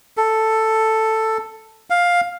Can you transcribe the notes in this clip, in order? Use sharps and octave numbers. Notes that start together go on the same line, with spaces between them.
A4
F5